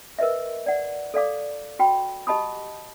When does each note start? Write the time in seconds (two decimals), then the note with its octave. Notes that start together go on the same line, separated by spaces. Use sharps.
0.19 A#4 B4 D#5 E5
0.66 D5 F#5
1.14 A4 D5 F5 D6
1.79 F#4 G5 B5
2.27 G4 D#5 A5 B5 D#6